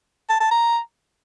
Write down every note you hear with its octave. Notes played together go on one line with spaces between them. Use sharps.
A5
A5
A#5